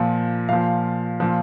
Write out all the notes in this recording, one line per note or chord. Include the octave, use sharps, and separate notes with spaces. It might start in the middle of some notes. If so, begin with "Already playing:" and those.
Already playing: A#2 F3
A#2 F3 F5
A#2 F3